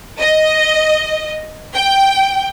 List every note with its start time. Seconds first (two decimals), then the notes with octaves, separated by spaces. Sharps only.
0.20 D#5
1.75 G5